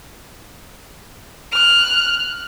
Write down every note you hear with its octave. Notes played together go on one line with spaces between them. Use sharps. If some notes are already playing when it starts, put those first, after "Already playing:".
F6 F#6